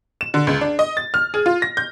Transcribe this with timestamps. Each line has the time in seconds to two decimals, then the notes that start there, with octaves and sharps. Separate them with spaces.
0.21 E7
0.34 D3
0.47 C#2
0.61 D4
0.79 D#5
0.97 A6
1.14 F6
1.34 G#4
1.46 F4
1.62 A#6
1.77 G6